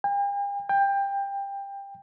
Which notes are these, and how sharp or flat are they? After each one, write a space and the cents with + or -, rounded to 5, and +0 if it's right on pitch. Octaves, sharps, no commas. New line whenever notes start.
G5 +45
G5 +20